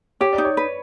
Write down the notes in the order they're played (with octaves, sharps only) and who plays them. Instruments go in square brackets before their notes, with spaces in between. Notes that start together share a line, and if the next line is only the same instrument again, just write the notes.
[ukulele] G4 [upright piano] C#5
[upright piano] D5
[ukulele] D#4
[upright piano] C#5
[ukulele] B4